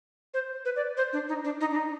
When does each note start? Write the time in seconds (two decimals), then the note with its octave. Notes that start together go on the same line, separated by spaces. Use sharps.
0.34 C5
0.65 B4
0.76 D5
0.97 C5
1.13 D4
1.29 D#4
1.44 D4
1.61 D#4
1.71 D4
1.76 D#4